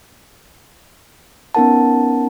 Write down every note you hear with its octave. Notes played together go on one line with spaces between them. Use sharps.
B3 C#4 D#4 A#4 F#5 A5